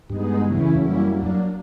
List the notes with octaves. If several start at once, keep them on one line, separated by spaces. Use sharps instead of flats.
G2 G#3 B3 D#4 G#4
C#3 E3 A3 C#4 E4
F#2 G3 A#3 C#4 E4
F#3 A#3 D4